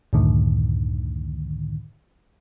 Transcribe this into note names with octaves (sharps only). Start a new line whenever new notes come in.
C#2 F#2 A2 D3 D#3